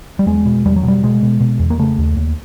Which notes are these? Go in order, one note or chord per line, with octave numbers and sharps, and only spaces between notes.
G3
E2 G#3
B2
E2 G3
F#3
B2 G3
B2 G#3
B2
B2
E2
A#3
C#3 A3
D#2
D#2